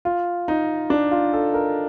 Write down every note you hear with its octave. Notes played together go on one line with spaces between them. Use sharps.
F4
D#4
D4
F4
A4
A#4